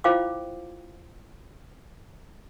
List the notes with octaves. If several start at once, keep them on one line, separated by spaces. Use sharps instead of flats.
E4 F4 C5 F5 G5 D6